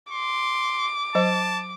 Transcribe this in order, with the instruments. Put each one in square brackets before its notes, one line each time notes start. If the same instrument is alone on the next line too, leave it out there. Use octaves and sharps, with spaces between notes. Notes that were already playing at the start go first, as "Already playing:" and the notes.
[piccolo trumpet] C6 [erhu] D6
[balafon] F#3 C5 D#5 [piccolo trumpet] A5